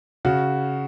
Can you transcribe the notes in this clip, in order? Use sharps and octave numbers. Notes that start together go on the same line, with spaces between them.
C#3 F#4